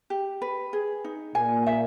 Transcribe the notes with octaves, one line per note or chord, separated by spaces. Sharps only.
G4
B4
G#4
D#4
A#2 A#3 G#5
E5